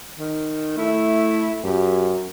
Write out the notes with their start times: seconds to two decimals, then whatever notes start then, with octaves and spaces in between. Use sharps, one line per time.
0.19 D#3
0.78 A3 E4
1.64 F#2 G4